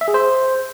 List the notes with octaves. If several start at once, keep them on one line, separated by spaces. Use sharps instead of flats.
E5
G#4
C5